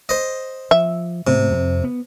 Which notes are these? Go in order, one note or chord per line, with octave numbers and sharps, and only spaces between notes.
C5 D#5
F3 E5
G#2 C3 A3 B3
F2
B3